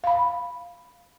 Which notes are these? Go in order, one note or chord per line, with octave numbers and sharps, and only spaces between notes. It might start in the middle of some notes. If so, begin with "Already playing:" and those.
F5 B5